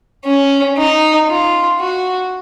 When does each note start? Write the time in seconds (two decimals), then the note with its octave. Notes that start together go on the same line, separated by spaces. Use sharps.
0.25 C#4
0.77 D#4
1.28 F4
1.80 F#4